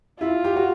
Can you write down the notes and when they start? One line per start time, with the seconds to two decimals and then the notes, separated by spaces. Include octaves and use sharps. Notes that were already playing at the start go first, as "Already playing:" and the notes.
0.20 E4 F4
0.44 G4
0.56 F#4